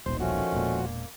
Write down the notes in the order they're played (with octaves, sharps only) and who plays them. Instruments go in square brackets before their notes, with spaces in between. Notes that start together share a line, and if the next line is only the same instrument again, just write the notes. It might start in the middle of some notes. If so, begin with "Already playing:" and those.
[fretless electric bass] D#1 B1 [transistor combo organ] C5
[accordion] D#3 A3 C#4 [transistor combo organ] F3 F#4
[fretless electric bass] E1 A#2
[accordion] A#3